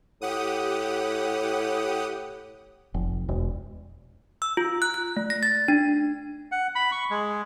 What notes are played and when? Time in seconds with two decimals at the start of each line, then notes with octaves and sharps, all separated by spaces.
0.21 A2 G4 F#5 D#6
2.94 F1
3.29 E1
4.42 E6
4.57 F4
4.82 F#6
4.94 F#6
5.17 A3
5.30 A#6
5.43 A6
5.68 D4
6.52 F#5
6.75 B5
6.92 C#6
7.11 G#3